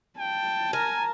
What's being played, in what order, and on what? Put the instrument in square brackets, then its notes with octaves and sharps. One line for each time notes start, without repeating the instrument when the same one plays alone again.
[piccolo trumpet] G5 [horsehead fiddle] A5
[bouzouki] A#4 [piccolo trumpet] G#5